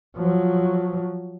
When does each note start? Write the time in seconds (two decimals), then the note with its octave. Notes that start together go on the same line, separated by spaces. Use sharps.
0.16 F3 F#3